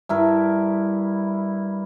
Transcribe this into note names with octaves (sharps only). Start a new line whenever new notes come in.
G2 E4 A#4